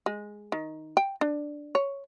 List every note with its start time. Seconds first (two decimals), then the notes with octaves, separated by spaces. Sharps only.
0.06 G#3
0.52 D#3
0.97 G5
1.21 D4
1.75 C#5